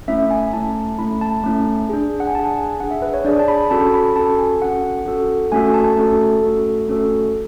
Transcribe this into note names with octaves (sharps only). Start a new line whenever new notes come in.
A3 C#4 E4 E5
G#5
A3 C#4 E4 A5
A3 C#4 E4 B5
A5
A3 C#4 E4
D4 G#4
F#5
G#5
D4 G#4 A5
G#5
D4 G#4 F#5
E5
B4
C#5
D4 G#4 D5
A5
B5
C#4 F#4 A4 A5
B5
C#4 F#4 A4 A5
G#5
C#4 F#4 A4 F#5
C#4 F#4 A4
A3 C#4 F#4 A4 G#5
A5
A3 C#4 F#4 A4
A3 C#4 F#4 A4
A3 C#4 F#4 A4